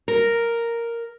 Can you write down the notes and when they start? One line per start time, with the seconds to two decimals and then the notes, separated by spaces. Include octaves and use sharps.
0.08 A#4